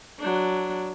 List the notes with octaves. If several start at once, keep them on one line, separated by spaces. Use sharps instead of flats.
F#3 D4